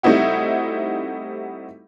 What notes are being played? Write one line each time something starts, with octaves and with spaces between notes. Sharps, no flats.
G3 A3 C4 D#4 E4 F#4